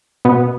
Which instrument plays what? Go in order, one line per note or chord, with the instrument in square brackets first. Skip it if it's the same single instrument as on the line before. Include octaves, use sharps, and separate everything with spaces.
[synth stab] B2 B3